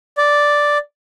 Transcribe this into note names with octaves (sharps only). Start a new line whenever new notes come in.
D5